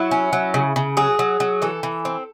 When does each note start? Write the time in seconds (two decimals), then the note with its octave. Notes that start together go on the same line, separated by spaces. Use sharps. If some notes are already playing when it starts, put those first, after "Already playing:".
Already playing: F#3 E4
0.11 C#4
0.33 F#3
0.54 C#3
0.76 C#3
0.97 F#3 G#4
1.19 F#3
1.40 F#3
1.62 E3 A4
1.83 E3
2.05 C4